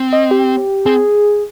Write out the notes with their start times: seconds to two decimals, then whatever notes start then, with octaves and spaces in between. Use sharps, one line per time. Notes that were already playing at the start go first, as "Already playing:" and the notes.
Already playing: C4
0.13 D#5
0.31 G4
0.86 C4 G#4